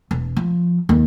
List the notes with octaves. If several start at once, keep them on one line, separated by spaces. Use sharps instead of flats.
E1
F3
D#2